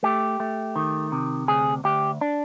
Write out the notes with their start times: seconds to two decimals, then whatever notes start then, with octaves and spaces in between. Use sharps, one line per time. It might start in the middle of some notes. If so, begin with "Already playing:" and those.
0.03 A3 G4
0.40 A3
0.76 D#3
1.12 C3
1.48 D2 G#4
1.84 D2 G4
2.21 D4